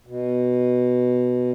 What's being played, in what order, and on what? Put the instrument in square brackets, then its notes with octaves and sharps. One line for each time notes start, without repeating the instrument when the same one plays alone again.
[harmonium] B2